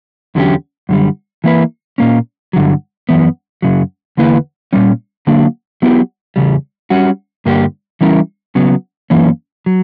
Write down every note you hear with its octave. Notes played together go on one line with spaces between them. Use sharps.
E2 D3 F#3 C#4 G4
F#2 D3 G3
E3 A#3 E4 B4
A#2 A#3 C#4
G2 D3 F#3
F#2 E3 B3
F#2 C#3 F#3
E2 D3 A#3 E4 B4
A#2 G3 C#4
D3 F#3 A#3 D4
F#3 B3 E4 G4
E2 C#3 G3
G3 C#4 F#4
G2 D3 A#3 D4 G4
E3 G3 C#4 E4 A#4
C#3 F#3 B3
F#2 E3 A#3 C#4
F#3